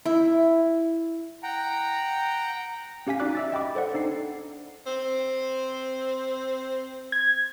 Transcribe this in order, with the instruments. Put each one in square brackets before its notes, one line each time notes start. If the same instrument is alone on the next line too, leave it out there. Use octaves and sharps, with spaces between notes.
[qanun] E4
[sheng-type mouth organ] F#5 G5 A#5
[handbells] C#4 G4 F5 G#5 B6
D#4 F#4 D5 D6 F#6
E5 E6 A6
D#5 G5 B5 D6
A4 C5 D5 F#5
D4 D#4 A4 C7
[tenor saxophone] C4
[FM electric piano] G#6